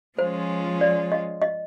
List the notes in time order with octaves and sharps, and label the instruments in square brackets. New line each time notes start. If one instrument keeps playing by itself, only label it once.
[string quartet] F3 G#3 C#4 F4 [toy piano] C5
[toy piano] D5
D#5
D#5